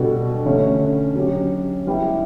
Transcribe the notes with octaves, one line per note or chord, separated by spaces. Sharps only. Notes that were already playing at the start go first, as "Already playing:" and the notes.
Already playing: B2 G3 D4 F#4 A4
D3 A3 C#4
F#3 C#4 G4
G3 B3 E4 G4